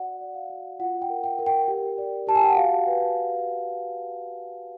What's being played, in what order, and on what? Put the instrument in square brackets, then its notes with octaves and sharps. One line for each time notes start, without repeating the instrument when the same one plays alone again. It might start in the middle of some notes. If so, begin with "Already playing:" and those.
Already playing: [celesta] F#4 D5 F#5
D5
F5
F#4
F4 F#5
G5
A#4
G5
A#4
G5
G4
D5
G4 A5
G#5
G5
F#5
F#4 F5
B4